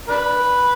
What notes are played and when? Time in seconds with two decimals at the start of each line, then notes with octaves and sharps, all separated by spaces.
0.09 D4 B4